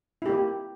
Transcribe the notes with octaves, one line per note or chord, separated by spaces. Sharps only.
A#3 E4 G4